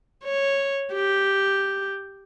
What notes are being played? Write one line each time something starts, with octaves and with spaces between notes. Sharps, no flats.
C#5
G4